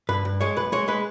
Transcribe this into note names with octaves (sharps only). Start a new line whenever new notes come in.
G2 B4
G2
G#3 C#5
B1 B4
G#3 C#5
G#3 B4